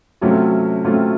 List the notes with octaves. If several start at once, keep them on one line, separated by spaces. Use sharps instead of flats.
C3 F#3 A3 C#4 F4
C3 F#3 A3 C#4 F4